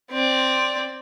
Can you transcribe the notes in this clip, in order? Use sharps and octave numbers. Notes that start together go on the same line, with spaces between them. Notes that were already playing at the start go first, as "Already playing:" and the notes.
C4 D5